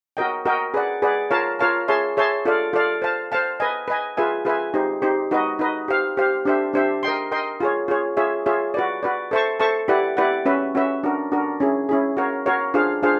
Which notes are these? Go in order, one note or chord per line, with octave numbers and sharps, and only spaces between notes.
F#4 A#4 D#5 G5
F#4 A#4 D#5 G5
G#4 B4 D5 F#5
G#4 B4 D5 F#5
F4 A#4 C#5 F5 A5
F4 A#4 C#5 F5 A5
G#4 C#5 E5 A5 C6
G#4 C#5 E5 A5 C6
F4 A4 D5 F5
F4 A4 D5 F5
C5 F5 A5
C5 F5 A5
B4 D#5 G#5
B4 D#5 G#5
F4 G#4 B4 E5 G#5
F4 G#4 B4 E5 G#5
D#4 G4 C5
D#4 G4 C5
D#4 F#4 B4 D#5
D#4 F#4 B4 D#5
G4 C5 F5
G4 C5 F5
D4 G4 C5 E5
D4 G4 C5 E5
A#4 D#5 G5 C6
A#4 D#5 G5 C6
F4 G#4 C#5
F4 G#4 C#5
F4 G#4 C#5 E5
F4 G#4 C#5 E5
F#4 B4 D5
F#4 B4 D5
A4 C5 E5 A5 C#6
A4 C5 E5 A5 C#6
E4 G4 B4 D5 F#5
E4 G4 B4 D5 F#5
C#4 F#4 B4 E5
C#4 F#4 B4 E5
D4 F#4 A#4
D4 F#4 A#4
C#4 E4 G#4
C#4 E4 G#4
F#4 A#4 C#5 F5
F#4 A#4 C#5 F5
D4 F4 G#4 C5 F5
D4 F4 G#4 C5 F5